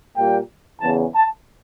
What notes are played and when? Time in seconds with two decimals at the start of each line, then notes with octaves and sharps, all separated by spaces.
0.17 A#2 G3 A#3 G5
0.81 E2 C#3 E3 A5
1.15 A5